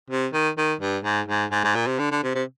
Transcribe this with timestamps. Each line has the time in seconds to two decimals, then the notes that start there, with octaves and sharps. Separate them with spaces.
0.10 C3
0.33 D#3
0.58 D#3
0.81 G2
1.04 G#2
1.28 G#2
1.52 G#2
1.64 G#2
1.76 A#2
1.87 C3
1.99 D3
2.11 D3
2.23 C3
2.35 C3